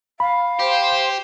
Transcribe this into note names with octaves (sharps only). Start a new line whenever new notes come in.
F5 B5
G4 C5